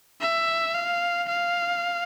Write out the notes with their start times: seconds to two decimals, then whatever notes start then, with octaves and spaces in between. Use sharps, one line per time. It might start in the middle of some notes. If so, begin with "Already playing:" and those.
0.21 E5
0.75 F5
1.28 F5